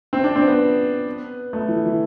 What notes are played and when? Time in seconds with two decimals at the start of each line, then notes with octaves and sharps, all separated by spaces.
0.13 C4
0.24 D4
0.36 C4
0.47 B3
1.53 A3
1.68 E3
1.85 E3